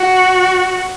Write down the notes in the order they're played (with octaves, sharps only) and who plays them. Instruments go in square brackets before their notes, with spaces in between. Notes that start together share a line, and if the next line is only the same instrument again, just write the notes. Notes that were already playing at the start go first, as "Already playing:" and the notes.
Already playing: [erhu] F#4